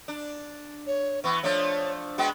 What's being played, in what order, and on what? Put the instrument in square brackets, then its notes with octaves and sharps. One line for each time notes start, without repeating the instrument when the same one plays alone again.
[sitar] D4
[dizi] C#5
[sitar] E3 B3 [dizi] C#6
[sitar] F3 A3 D4 [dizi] C#5
[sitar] G#3 B3 F#4 [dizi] G5